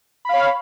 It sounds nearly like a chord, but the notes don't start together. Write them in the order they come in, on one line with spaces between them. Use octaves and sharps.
B5 F5 C#5